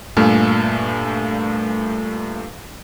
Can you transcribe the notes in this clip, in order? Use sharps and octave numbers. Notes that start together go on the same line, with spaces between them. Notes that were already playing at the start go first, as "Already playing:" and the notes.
G2 A#2 A3 A4 G#5 F6